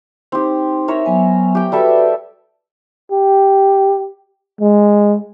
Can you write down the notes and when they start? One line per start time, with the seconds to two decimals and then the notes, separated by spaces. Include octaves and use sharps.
0.32 C4 D#4 G4
0.88 A#4 C#5 E5
1.06 F#3 B3 G#5
1.55 G4 G5
1.72 G3 F#4 A4 B4 E5
3.12 G4
4.61 G#3